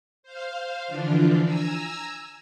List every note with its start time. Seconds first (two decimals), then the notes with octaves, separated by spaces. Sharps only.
0.23 C5 F5
0.88 D3 E3 F3 D4 F4
1.44 G#5 A#5 E6